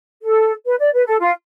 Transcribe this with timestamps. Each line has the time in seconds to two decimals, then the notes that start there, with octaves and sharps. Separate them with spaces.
0.23 A4
0.65 B4
0.79 D5
0.93 B4
1.06 A4
1.20 F4